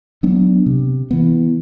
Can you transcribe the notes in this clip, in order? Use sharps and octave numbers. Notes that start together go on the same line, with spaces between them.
F#3 B3 D4
C3
E3 B3